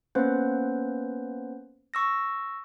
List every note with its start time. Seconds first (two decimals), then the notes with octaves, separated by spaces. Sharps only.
0.15 A#3 B3 C#4 B4 C5
1.94 C#6 E6 A#6